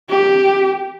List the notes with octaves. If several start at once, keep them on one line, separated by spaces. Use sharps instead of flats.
G4